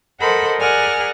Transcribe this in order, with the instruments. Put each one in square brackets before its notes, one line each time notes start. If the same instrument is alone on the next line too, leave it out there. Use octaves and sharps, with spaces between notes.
[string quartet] A4 A#4 C5 D#5 F#5 B5
G#4 A#4 D5 F#5 G#5 F6